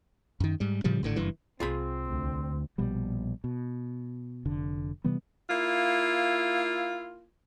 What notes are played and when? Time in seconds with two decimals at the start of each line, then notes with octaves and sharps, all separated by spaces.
0.40 F#2 D#3
0.60 G#2 G3
0.84 A2 C#3 F3 G3
1.03 G#1 A2 D3
1.16 F#1 G2 E3
1.60 C2 C4 F4 G#4 B5
2.05 D2
2.78 A#1 B2 G3
3.44 B2
4.45 F1 D3
5.04 C3 E3 G3 B3
5.50 A#3 E4 F4